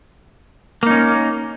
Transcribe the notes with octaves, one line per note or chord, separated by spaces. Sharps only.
A#3 C#4 D#4